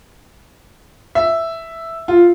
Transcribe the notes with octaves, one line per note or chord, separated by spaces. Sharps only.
E5
F4